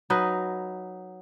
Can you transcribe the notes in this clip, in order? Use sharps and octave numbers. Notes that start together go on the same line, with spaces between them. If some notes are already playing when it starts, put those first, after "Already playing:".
F#3 D#4 B4 D#5